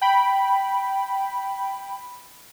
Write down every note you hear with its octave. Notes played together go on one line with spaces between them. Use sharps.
G5 B5